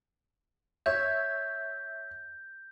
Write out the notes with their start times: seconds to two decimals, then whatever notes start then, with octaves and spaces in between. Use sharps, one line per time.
0.86 C#5 E5 G6